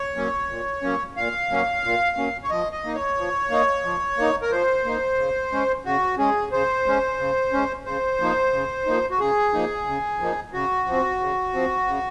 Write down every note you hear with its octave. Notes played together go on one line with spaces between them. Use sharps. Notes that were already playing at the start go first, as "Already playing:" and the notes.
Already playing: C#5
F#3 A#3 C#4
A#2
F#3 A#3 C#4
A#2 F5
F#3 A#3 C#4
A#2
F#3 A#3 C#4
C#5
F3 D#5
D#5
A#3 D#4
C#5
F3
A#3 D#4
F3
A#3 D#4
A#4
F3 C5
A#3 D#4
C#3
G#3 C#4
C#3 F#4
G#3 C#4 G#4
C#3 C5
G#3 C#4
C#3
G#3 C#4
C#3 C5
F3 A#3 D#4
C#3
F3 A#3 D#4
F#4
C#3 G#4
F3 A#3 D#4
C#3
F3 A#3 D#4
C#3 F#4
F3 C4
C#3
F3 C4
C#3